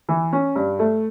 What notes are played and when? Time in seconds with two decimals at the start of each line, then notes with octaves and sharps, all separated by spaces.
0.09 E3
0.33 C#4
0.56 G2
0.79 A3